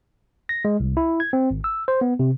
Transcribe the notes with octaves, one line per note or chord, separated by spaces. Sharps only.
A#6
G#3
C2
E4
G#6
C4
G#1
E6
C5
B3
C3